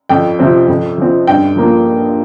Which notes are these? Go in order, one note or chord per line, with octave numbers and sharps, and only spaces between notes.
F2 G5
C3 F3 C4
F2
F3 C4
G2 G5
F3 A#3